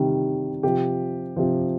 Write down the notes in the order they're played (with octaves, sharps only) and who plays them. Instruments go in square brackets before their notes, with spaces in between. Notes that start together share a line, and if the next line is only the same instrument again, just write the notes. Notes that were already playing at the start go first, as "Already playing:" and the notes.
Already playing: [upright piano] C3 D#3 G3
C3 F3 G4
C3 F3